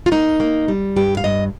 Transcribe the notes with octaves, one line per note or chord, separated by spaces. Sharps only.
F4
A#3 D#4
A#3
G3
G2 G4
F5
G2 D#5